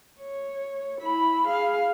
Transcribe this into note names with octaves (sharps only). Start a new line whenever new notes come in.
C#5
E4 B5
G#4 F5